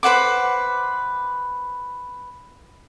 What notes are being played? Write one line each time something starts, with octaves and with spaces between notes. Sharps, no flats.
B4 C5 F#5 D6